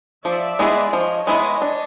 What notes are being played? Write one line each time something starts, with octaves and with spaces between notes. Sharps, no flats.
F3 D5 E5
G#3 B3 E4 G#4
F3 C#5 D#5
G#3 B3 E4 G#4
D4